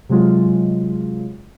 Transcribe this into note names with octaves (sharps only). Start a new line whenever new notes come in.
C3 F#3 G#3 F4